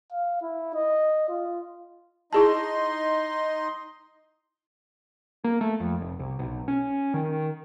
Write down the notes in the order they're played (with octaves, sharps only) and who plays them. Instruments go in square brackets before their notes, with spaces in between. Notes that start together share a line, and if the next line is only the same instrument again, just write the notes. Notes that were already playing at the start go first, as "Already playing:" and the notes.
[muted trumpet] F5
E4
D#5
F4
[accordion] D#4 D#5 C6 [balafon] E4 G#4 A5
[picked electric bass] A#3
A3
F2
F1
C2
B1
C#4
D#3